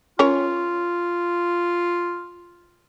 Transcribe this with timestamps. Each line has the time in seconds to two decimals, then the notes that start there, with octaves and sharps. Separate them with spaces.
0.19 C#4 F4 A#4 C#5